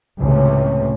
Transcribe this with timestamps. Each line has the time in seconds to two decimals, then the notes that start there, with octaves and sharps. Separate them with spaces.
0.20 C#2 A2 C3 E3 C#4